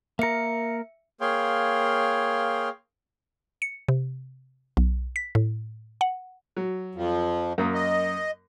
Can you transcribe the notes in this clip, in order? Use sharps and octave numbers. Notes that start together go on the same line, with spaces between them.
A#3 A#4 E5 C#7
A#3 G#4 C#5 F5 G5 C6
C#7
C3
B1
B6
A2
F#5
F#3
F2 F3
F#2 A#3 D#6
D#5